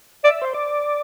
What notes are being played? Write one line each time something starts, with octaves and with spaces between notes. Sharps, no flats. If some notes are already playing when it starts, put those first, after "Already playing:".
D5 E5
C5
D5